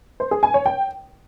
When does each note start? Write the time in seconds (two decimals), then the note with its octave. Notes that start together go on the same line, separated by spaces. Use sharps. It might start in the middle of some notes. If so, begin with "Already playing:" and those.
0.20 C5
0.31 G#4
0.43 G#5
0.54 C#5
0.66 G5